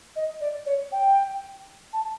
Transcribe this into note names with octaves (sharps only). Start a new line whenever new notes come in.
D#5
D5
C#5
G5
A5